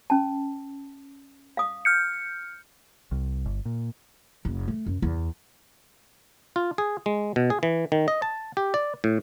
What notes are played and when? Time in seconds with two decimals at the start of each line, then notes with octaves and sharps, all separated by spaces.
0.10 C#4 A5
1.57 F5 D#6
1.85 F6 G6 C#7
3.11 C2
3.46 G1
3.65 A#2
4.45 F#1
4.68 A3
4.86 F#2
5.02 E2
6.56 F4
6.78 G#4
7.06 G#3
7.36 B2
7.50 G#4
7.63 E3
7.92 D#3
8.08 D#5
8.22 A5
8.57 G4
8.74 D5
9.04 A2